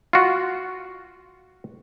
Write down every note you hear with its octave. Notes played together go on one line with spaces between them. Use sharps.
F4 F#4